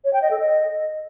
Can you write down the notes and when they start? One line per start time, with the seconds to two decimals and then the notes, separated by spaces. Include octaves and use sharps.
0.04 C#5
0.13 G5
0.22 D#5
0.31 A4
0.40 D#5